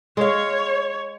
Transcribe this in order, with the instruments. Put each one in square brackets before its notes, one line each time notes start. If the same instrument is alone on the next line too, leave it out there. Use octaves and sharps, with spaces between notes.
[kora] G#3 F5 [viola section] C#5